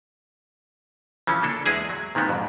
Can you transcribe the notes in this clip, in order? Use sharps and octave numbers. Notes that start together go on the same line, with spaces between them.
C#3 E3 F3 C#4
A#3 D4 A4
E2 G#3 E4 G#4 G#5
F#3
A#2 D#3 G#3 B3 C4
F2 G#2